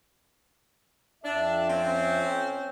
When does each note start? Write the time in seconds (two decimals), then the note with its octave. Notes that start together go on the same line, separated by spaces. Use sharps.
1.24 F2 D4 E5
1.69 C4 C#4